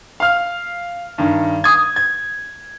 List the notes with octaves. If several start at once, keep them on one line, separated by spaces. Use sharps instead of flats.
F5 F6
G2 D#3
D#6 G#6
G#6